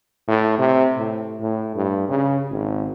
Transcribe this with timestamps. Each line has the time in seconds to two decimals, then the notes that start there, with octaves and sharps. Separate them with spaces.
0.28 A2
0.58 C3
0.98 A2
1.41 A2
1.75 G2
2.09 C#3
2.50 G#1